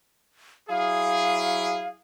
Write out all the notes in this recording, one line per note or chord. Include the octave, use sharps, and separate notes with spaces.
F#3 E4 G#4 F5